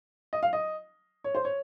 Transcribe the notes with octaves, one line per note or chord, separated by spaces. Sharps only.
D#5
F5
D#5
C#5
C5
C#5